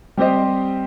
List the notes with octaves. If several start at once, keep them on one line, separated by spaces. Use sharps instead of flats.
G3 C4 G4 C5 D#5